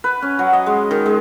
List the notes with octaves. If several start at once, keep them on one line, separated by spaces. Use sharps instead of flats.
B4
C#4
F#3
D#5
G#3
D#3
G#3